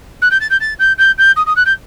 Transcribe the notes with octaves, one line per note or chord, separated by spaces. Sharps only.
F#6
G6
A6
G6
A6
G6
G6
G6
D#6
D#6
F#6
G6